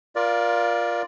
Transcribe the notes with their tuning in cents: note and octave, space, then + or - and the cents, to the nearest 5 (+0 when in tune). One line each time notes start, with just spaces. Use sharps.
F4 +0 A#4 +30 D5 +0